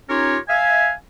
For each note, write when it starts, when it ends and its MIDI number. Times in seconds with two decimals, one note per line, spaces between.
0.09 0.38 61
0.09 0.38 63
0.09 0.38 65
0.09 0.38 67
0.09 0.38 70
0.09 0.38 73
0.49 0.93 76
0.49 0.93 77
0.49 0.93 80